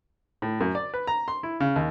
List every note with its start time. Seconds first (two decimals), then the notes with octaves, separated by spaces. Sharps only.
0.42 A2
0.60 F#2
0.75 D5
0.94 B4
1.07 A#5
1.28 C6
1.43 E4
1.60 C#3
1.76 D#2